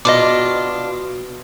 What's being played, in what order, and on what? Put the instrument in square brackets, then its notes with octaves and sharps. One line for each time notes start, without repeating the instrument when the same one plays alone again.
[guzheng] B2 [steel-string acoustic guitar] D4 F4 [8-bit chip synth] D#5 D6